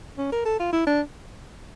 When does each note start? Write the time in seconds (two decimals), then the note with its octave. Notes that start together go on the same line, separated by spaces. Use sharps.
0.18 C#4
0.32 A#4
0.45 A4
0.60 F4
0.73 E4
0.87 D4